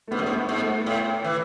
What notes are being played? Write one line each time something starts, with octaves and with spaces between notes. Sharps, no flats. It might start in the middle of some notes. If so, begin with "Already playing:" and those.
A3
G#2 B3
F#2
G#2
B3
G#2
A3
A2
E3